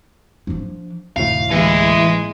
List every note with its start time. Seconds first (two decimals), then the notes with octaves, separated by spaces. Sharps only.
0.47 F3 D4
1.16 F1 D2 A2 F5
1.51 A1 E3 G#3 A#3